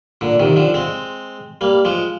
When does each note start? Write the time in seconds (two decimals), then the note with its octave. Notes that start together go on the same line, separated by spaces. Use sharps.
0.21 A#2 D3
0.40 C3 D#3
0.56 D3 F3
0.74 G#3 C4
1.61 G3 A#3
1.85 F3 G#3